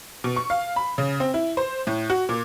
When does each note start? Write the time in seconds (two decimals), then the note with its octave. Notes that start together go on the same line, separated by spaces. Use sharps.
0.24 B2
0.36 C#6
0.50 F5
0.76 B5
0.98 C#3
1.20 C4
1.34 E4
1.57 C5
1.87 A2
2.10 F#4
2.29 A#2